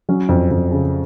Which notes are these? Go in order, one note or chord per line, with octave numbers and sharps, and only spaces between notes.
F#3 C#4
F2
F2
C#3